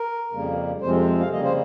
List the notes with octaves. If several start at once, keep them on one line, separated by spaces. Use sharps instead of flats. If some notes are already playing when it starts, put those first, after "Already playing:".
Already playing: A#4
F2 C#3 G3 A#3
F2 C3 F3 G#3 C4 C5
F5
C#3 G3 A#3 D#5
C5